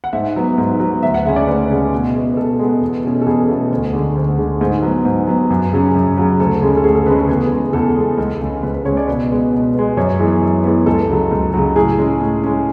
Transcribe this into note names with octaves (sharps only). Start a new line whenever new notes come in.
F#5
G#2 E5
F#3 B3
G#2
F#3 B3
D2 E5
F#5
C#3 G#3 C#4 E5
D5
D2 B4
C#3 G#3 C#4
B2
G#3 B3
B4
B2 A4
G#3 B3
E2
B2 A3 C#4
A4
E2 G#4
B2 A3 C#4
D2
D3 G#3
D2
D3 G#3
G#2 G#4
F#3 B3
G#2
F#3 B3
F#2
C#3 F#3 C#4
F#2
C#3 F#3 C#4
D2 A4
C#3 G#3 C#4
A4
D2 G#4
A4
C#3 G#3 C#4 B4
A4
E2 G#4
C#3 G#3 B3
E2 A4
C#3 G#3 B3
C#2
C#3 G#3 C#4
C#2 B4
B4
C#3 G#3 C#4 C#5
D5
B2 B4
G#3 B3
B2
G#3 B3
F#2 C#5
E3 G#3 B3
F#2
E3 G#3 B3
C#2 A4
C#3 F#3
C#2
C#3 F#3
A2 G#4
G#3 C#4
A2
G#3 C#4